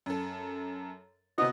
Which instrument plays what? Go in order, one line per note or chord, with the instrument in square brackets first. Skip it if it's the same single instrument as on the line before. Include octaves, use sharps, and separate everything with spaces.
[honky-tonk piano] F#2 A4
[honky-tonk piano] C3 B3 F#4 [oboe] D#5